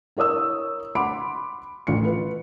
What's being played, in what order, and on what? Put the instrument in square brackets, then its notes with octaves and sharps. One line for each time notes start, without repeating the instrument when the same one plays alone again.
[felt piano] E4 A#4 C#5 D#6 E6
F#5 B5 C6 D6 D7
A1 F4 C#7
B4